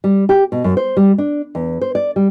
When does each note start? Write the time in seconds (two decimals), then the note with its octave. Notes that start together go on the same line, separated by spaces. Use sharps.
0.04 G3
0.29 G4
0.52 B2
0.64 F#2
0.77 C5
0.97 G3
1.18 D4
1.55 E2
1.81 C5
1.95 D5
2.16 G3